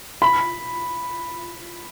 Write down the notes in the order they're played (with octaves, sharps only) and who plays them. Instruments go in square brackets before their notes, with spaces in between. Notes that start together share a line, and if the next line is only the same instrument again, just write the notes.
[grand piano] B5